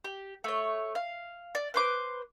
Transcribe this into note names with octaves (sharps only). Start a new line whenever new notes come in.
G4
A3 C#5
F5
D5
B4 C5 D6